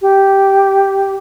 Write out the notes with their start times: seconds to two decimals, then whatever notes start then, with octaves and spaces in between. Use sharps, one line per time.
0.02 G4